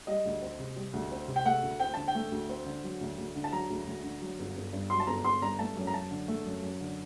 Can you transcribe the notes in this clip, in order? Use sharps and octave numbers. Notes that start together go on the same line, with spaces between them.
G3 D#5
D2
C4
C3
G3
D2
C4
C3
G5
A3 F#5
D2
C4 G5
D3 A5
G5
A3
D2
C4
D3
F#3
D2
D2
D3
A5
F#3 A#5
D2
D2
D3
F#3
G1
G1
G2
F#3 C6
A5
G1 A#5
G1 C6
G2 A#5
A3 A5
F#2
A#5
F#2 A5
D3
A3
F#2
F#2
D3